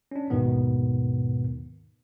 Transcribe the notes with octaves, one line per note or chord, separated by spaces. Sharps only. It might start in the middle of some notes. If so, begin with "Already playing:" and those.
C#4 D4
D#2 G#2 B2 D#3 B3